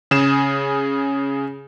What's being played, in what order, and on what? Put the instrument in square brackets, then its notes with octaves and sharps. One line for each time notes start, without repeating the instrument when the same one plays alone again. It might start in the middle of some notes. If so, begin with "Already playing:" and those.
[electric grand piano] C#3 G#4 E7